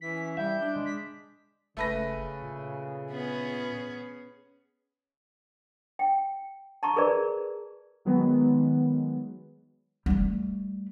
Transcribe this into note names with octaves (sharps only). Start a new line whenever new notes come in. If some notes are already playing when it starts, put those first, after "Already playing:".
E3 C#4 B6
G3 E4 E5 G6
D4
G#3
B6
F#1 C#3 A3 B4 A#6
A#2
B3 C#4 G#4
G5
A5 A#5 C#6
G#4 A#4 B4 D5
D#3 F#3 G#3 B3
G3 A3